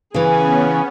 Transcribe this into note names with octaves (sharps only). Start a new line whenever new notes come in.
C#3 E3 B3 C#4 G#4 B4 G#5